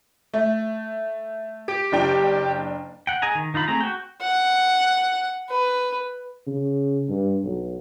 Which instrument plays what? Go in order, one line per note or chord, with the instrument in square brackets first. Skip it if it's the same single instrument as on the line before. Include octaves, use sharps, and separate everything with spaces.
[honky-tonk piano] A3
[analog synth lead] G4 [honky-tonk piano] D7
[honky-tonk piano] F#1 D4 G5
[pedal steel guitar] F#5 G5
G#4 D#5 G#5 A#5
D#3
D#3 D#4 F4 B5
A3 C4 G#4 A#5
F#4 G5
[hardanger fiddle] F#5
B4
[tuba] C#3
G2
B1